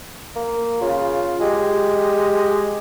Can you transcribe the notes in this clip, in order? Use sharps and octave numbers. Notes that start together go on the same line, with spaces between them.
A#3
C#3 F4
G#3 G4